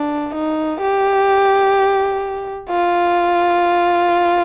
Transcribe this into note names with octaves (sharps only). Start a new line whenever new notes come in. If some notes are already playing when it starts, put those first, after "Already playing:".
Already playing: D4
D#4
G4
F4